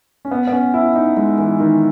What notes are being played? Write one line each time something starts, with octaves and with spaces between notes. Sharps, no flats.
C#4
B3
B3
C#4
E4
D#4
G#3
E3
D#3